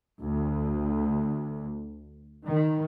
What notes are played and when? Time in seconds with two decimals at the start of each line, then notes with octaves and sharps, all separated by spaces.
0.19 D2
2.47 D#3